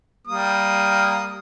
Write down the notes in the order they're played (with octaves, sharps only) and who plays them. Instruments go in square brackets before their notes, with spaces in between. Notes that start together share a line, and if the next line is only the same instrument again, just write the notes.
[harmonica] G3 A#3 D#6